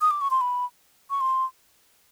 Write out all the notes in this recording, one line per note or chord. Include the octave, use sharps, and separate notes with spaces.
D#6
D6
C#6
C6
B5
C#6
C6